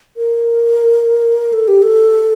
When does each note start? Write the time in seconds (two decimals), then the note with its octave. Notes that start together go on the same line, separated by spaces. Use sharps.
0.17 A#4
1.53 A4
1.68 G4
1.82 A4